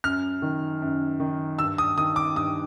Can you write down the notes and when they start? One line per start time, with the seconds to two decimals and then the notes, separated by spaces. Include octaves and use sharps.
0.04 F#2 F6
0.42 D#3
0.82 F#2
1.20 D#3
1.59 G2 E6
1.78 D#6
1.98 D#3 D#6
2.16 D6
2.35 G2 D#6